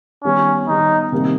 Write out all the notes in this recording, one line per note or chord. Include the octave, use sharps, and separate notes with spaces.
D#3 G3 B3 C#4
D#3 G3 B3 D#4
C3 D#3 G3 A#3